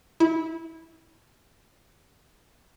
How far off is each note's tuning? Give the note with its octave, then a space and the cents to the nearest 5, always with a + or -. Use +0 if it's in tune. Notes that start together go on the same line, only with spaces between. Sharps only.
E4 -20